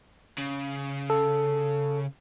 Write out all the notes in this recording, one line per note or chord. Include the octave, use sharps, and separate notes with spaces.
C#3
A4